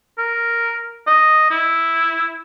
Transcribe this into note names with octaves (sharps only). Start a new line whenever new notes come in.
A#4
D#5
E4